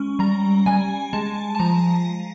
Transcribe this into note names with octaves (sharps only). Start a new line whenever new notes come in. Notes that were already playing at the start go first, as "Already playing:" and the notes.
Already playing: G#3 C#4
G3 A#5
G3 G#5
G#3 A5
A5
F3 A#5